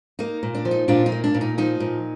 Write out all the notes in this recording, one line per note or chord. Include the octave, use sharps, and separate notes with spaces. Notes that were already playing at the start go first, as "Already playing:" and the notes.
A#3 D#4
A#2
D4
F3
D#4
A#2 D4 F4
D#4
A#3
D4
A#2
D#4
F3 D#4
A#2